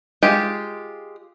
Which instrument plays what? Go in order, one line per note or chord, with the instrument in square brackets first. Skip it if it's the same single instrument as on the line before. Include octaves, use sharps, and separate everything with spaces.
[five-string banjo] G#3 F4 G4